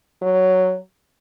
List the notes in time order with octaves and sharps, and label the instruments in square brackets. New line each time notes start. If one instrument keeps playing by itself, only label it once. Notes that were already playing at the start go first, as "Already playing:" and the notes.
[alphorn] F#3